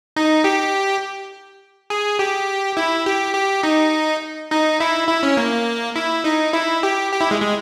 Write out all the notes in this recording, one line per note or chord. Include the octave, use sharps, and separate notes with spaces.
D#4
G4
G#4
G4
E4
G4
G4
D#4
D#4
E4
E4
C#4
A#3
E4
D#4
E4
G4
G4
E4
G#3
G#3